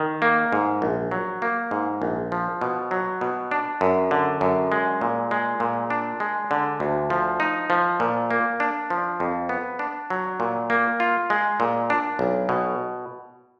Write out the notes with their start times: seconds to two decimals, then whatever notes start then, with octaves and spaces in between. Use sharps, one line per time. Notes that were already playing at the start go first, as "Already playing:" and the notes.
Already playing: D#3
0.22 A#3
0.52 G#2
0.82 A#1
1.11 F#3
1.42 A#3
1.71 G#2
2.02 A#1
2.32 F3
2.61 B2
2.91 F#3
3.21 B2
3.51 D4
3.81 F#2
4.11 D3
4.41 F#2
4.72 G#3
5.01 A#2
5.31 G#3
5.60 A#2
5.90 D4
6.20 G#3
6.51 D3
6.80 D2
7.10 F3
7.40 D#4
7.70 F3
8.00 A#2
8.31 A#3
8.60 D4
8.90 F3
9.20 F2
9.49 B3
9.79 D4
10.10 F#3
10.40 A#2
10.70 A#3
11.00 F4
11.30 G#3
11.60 A#2
11.90 D4
12.19 B1
12.49 B2